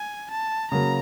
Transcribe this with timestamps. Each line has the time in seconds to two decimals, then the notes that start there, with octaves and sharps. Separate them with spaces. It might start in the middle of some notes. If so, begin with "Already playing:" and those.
Already playing: G#5
0.31 A5
0.71 C#3 F#3 A#3 A#5